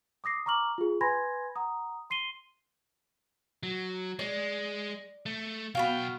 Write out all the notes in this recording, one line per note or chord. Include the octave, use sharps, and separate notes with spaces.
D6 D#6 A#6 C7
A#5 C#6 D6 F6 F#7
F4 G#4
B4 G#5 B5 C6 G#6 A#6
F#5 A#5 D#6
C6 C7 D#7 G7
F#3
G#3 D5
A3
B1 B3 F#4 F5 G5